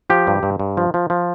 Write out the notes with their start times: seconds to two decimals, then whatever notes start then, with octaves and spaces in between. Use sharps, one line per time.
0.10 F3 G4
0.27 G2
0.43 G2
0.59 G2
0.77 F3
0.94 F3
1.10 F3